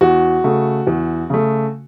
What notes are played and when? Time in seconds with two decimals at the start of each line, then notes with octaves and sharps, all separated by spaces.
0.01 E2 F#4
0.44 C#3 A3
0.87 E2
1.30 C#3 A3